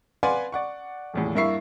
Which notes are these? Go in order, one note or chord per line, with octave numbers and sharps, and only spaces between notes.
B4 D5 F5 F#5 G#5 C6
D5 F#5 C#6
D#1 E2 A2
G2 A#3 E4 E5 C#6 C7